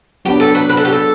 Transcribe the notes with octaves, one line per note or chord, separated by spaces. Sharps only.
F#3 B3 D4 G4
A4
B4
B4
A4
G4
A4